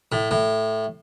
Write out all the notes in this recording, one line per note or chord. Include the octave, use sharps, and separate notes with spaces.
A2
A2